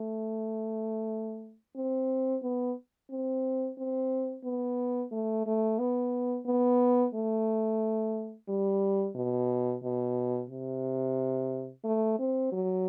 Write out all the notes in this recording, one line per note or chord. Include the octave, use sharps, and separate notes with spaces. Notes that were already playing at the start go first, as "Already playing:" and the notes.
Already playing: A3
C4
B3
C4
C4
B3
A3
A3
B3
B3
A3
G3
B2
B2
C3
A3
C4
F#3